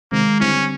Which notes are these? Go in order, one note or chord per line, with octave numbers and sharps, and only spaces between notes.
C3 D#3 G#3 A#3 C4
D3 G3 C4 C#4 E4